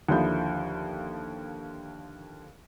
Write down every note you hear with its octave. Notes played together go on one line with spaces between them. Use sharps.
D#2 D3 F3 E4 G6